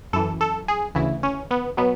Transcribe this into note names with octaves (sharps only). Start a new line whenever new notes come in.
F#2 E3 A4
A4
G#4
D2 C#3 E3 E4
C#4
B3
B2 F#3 B3